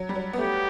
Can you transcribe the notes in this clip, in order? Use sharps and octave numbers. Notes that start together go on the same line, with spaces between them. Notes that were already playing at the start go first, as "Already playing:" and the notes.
Already playing: F#3
G3
F#3
B3
A3 G4